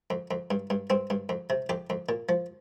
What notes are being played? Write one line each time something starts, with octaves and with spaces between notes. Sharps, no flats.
F2
F2
G2
G2
G2 C4
G2
F2
C3
F2 G4
F2
A#2
F3